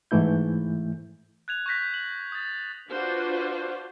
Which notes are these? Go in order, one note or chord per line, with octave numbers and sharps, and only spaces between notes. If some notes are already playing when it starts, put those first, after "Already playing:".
G#2 E3 A3 E4 G6
F#6 G#6 F7
C#6 F#6 G6 A#6 B6
F#7
D#6 A6
D4 F4 F#4 B4 C5